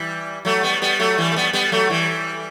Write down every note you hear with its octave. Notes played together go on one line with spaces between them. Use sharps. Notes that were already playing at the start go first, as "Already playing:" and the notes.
Already playing: E3 G3
F#3 A3
G3 B3
G3 B3
F#3 A3
E3 G3
A3
G3 B3
G3 B3
F#3 A3
E3 G3